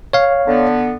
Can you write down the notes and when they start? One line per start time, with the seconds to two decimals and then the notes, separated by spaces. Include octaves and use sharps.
0.13 C#5 F5
0.47 D3 B3